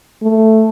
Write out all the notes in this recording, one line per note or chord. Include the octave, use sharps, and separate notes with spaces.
A3